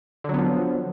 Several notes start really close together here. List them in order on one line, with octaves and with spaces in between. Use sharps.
D3 F#3 B3 F3